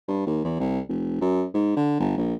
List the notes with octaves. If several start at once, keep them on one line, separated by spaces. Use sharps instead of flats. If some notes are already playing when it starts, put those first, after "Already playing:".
G2
D#2
E2
C2
F1
F#2
G#2
D3
G1
A#1